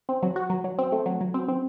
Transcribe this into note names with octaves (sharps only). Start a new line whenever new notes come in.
C4
F#3
F#4
F#3
F#3
C4
A3
F#3
F#3
C4
C4